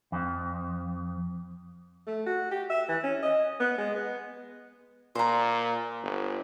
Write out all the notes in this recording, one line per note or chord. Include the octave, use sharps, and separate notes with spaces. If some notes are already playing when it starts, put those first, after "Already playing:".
F2
A3
F#4
G4
E5
E3
C#4
D#5
B3
G#3
B3
A#2 C5 A#5
G1